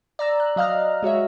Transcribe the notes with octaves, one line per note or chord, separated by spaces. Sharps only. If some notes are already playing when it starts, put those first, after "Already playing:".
D5 A#5 E6
F#6
F#3 D#5 F5 A#5 F6
G#3 F#4 C#5 E5